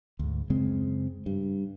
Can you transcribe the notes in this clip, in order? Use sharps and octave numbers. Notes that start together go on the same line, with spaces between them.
D2 G#2
F#2 C#3 G#3 C4
G2